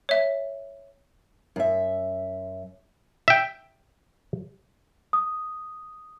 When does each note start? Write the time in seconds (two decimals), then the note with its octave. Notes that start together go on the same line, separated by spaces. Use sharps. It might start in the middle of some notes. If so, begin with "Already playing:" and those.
0.09 C#5 E5
1.56 F#2 E5
3.28 E5 G5
5.13 D#6